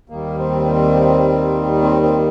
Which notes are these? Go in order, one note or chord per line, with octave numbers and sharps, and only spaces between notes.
D#2 D#3 G3 A#3
C4
C4
C4